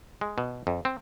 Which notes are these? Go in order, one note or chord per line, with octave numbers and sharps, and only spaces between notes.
G#3
B2
F2
C4